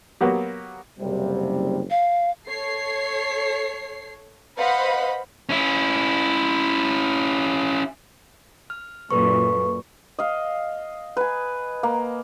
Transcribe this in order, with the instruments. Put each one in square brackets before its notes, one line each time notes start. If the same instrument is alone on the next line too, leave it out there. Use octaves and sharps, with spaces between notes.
[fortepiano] F#3 A#3 B3 G4
[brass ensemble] F#1 C3 G3
[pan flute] F5
[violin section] A4 C#5 C7
B4 C5 D#5 F5 F#5 B5
[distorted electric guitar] C#4 E4
[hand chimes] F6
[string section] F#2 A#2 [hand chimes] A4 B4 C#6
[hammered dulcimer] D#5 F5
B4 G#5
A#3